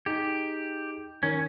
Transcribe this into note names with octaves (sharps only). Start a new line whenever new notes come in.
D#4 G4 G#4
D#3 C#4 A#4 C#5